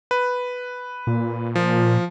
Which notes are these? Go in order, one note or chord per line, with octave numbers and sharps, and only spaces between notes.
B4
A#2
F3